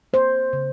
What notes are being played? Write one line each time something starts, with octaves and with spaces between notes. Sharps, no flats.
A#3 C5
C#3